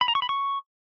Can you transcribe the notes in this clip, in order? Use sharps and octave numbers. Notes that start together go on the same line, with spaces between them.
B5
A#5
C#6
B5
C#6